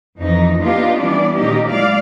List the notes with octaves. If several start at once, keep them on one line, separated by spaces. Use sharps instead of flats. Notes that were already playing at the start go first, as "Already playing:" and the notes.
F2 E3 D#4
A#3 B3 D4 D#4 F4 G4
E3 G3 B3 C#4 D4 D5
A#2 D#3 A3 C#4 D#4 G4
F#3 G#3 A3 E4 D5 F5